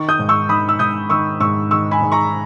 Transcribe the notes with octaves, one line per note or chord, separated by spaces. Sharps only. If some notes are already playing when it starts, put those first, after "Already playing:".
Already playing: D#3 C#6
D#6 G6
G#2
C#6 E6
D#3 B5 D#6
E6
G#2 D#6 G6
D#3 C#6 E6
G#2 C#6 E6
D#3 C#6 E6
G#5 B5
G#2
A#5 C#6